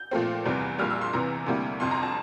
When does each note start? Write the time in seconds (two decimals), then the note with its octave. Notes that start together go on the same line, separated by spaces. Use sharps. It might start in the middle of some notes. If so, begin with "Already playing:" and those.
Already playing: G6
0.11 A#2 F3 A3 C4
0.45 F1 E2 C3 E3 G3
0.79 A#1 A#2 G3 F6
0.90 E6
1.01 C6
1.13 E2 C3 E3 A#5
1.46 D2 C3 G3 A#3 E4
1.80 G1 F2 C3 C6
1.91 A#5
2.03 A5